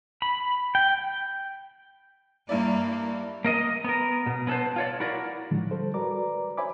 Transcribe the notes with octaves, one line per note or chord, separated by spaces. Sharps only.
B5
G5
G2 A#3 E4 D5
A#3 A#4 D#5
B3 A#4
B2
B3 C#4 A4 B4 C5
F4 C#5 D5
E4 F#4 A#4 D5
A2 D3 D#3 F3 G#3
G3 A4 C5
F#4 A#4 B4 D5 A#5 D6
C5 C#5 E5 G#5 B5 D6